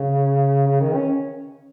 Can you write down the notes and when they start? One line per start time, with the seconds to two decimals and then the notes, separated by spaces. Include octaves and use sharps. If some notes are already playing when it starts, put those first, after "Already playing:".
Already playing: C#3
0.67 C#3
0.81 D#3
0.94 C#4